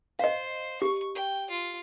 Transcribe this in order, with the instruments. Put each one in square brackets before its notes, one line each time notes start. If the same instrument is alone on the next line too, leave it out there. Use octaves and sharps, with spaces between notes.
[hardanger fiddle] C5 [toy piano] D#5 F5
[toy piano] G4 [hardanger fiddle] C#6
[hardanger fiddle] G5
F4